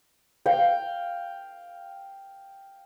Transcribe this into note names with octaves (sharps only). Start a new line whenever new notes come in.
F5 G5